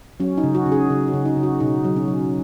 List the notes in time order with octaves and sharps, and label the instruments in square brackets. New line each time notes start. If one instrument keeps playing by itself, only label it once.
[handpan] F#3 C#4
D#4
C#3
F#4
C#3
G#4
C#3
F#4
C#3
D#4
C#3
F#4
B2 D#4
F#3
C#4
F#3